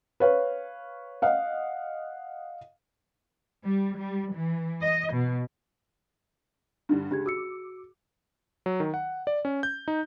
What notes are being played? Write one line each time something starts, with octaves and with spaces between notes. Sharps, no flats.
B4 C#5 F5
D#5 F5 F#5
G3
G3
E3
D#5
B2
G2 D3 G3
C#2 D4 G4 G#6
F#4 D6 E6 C#7
F#3
D#3
F#5
D5
C#4
G6
D#4